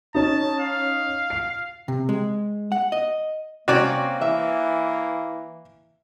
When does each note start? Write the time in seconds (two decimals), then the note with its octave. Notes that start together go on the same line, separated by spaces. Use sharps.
0.15 C#4 D#4 A5
0.60 F5
1.30 C7
1.88 C3
2.09 G#3
2.72 F#5
2.92 D#5
3.68 C3 A#3 C4 C#4 F#4 C#5 D5
4.21 E3 E5